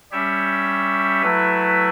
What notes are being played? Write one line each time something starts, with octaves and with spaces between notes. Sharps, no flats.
G3 C#4 G4 C#5 E5
F#3 A3 E4 B4